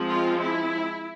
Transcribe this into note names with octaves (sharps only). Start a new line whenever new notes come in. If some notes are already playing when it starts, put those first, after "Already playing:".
Already playing: F3 G#3 C4
F4
E4